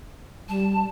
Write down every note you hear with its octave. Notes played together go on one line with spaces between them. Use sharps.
G3 A5